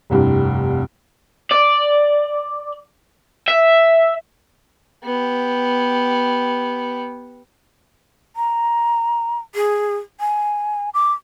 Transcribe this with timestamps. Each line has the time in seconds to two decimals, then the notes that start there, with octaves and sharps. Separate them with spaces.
0.10 F1 C2 G2
1.52 D5
3.48 E5
5.04 B3 G4
8.36 A#5
9.55 G#4
10.20 G#5
10.94 D6